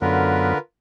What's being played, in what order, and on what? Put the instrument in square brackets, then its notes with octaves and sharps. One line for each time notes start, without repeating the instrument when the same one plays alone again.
[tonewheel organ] F#2 F#3 B3 [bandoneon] D3 [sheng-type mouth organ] F4 A#4 B4